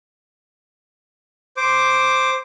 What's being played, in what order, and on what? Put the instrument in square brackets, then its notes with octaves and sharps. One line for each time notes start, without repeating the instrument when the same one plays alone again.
[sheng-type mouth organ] C5 D6